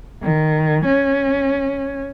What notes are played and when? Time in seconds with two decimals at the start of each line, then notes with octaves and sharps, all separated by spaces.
0.22 D#3
0.85 C#4